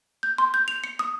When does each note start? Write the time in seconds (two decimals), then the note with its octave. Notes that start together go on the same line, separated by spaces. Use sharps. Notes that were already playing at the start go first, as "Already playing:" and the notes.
0.23 G6
0.38 C6
0.54 G6
0.68 F7
0.84 C#7
0.99 D#6